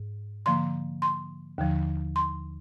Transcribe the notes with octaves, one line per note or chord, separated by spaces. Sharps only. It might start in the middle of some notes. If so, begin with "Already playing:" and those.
Already playing: G#2
D3 F3 A#3 C6
C6
D#2 D3 F3
C6